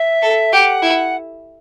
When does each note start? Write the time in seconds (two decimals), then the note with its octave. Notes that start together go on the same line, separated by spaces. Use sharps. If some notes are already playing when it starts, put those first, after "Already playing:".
Already playing: E5
0.22 A4
0.52 G4 F#5
0.82 E4